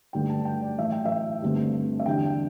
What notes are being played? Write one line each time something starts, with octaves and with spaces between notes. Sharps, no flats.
G2 D3 A3 D4 G5
A5
G5
D5
A2 E3 A3 E5
G5
E5
G2 D3 A3 C4
E5
E2 D3 G3 D4 G5